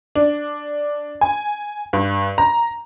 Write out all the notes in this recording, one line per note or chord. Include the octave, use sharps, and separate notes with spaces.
D4
G#5
G2
A#5